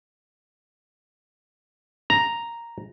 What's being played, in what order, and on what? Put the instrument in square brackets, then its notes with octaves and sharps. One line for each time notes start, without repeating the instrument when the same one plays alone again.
[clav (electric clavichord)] A#5